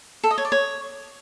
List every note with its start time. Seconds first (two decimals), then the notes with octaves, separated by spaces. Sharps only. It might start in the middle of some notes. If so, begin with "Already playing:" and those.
0.24 A4
0.31 D#5
0.38 C#5
0.45 D5
0.52 C#5